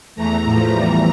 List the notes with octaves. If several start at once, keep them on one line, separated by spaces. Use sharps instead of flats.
E2 E3 A3 A#5
A2 F3 A3 A#5
E2 E3 G3 A#5